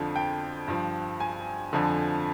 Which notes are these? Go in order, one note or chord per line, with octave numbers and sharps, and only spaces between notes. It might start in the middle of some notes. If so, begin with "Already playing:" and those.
Already playing: F2 D3 F3
G5
G2 F3
G#5
F2 D3 F3